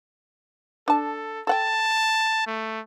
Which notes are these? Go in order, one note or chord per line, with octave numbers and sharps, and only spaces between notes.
D4 A4 A5
A4 F#5 G5 A5
A3